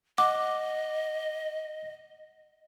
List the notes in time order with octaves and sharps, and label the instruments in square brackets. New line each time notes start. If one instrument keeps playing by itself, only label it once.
[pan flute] D#5 [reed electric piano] F#5 [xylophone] D6